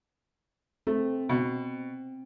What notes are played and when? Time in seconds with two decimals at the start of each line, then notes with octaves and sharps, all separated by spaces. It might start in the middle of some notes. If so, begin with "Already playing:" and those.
0.87 A3 C4
1.29 B2